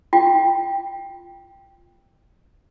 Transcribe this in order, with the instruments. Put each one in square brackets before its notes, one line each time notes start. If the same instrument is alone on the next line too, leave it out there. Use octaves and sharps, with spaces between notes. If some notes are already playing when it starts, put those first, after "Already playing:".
[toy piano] F4 G5